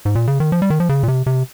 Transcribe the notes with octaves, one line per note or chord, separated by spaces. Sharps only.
G#2
A#2
C#3
D#3
F3
G3
D#3
F3
C#3
A#2
C3
C3